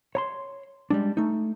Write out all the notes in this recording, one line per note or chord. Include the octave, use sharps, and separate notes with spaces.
C#5 A#5 C6
G3 G#3 D4
A3 D#4